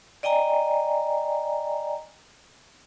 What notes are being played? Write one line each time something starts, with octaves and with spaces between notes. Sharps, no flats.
D5 D#5 G5 G#5 A#5